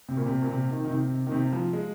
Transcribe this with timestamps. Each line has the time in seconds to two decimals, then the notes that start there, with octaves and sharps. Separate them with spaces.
0.09 C3
0.17 A#2
0.26 C3
0.42 A#2
0.50 C3
0.70 D#3
0.84 D#3
0.91 C3
1.27 D#3
1.32 C3
1.53 F3
1.73 G#3